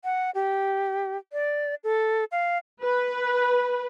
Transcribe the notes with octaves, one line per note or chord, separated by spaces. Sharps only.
F#5
G4
D5
A4
F5
B4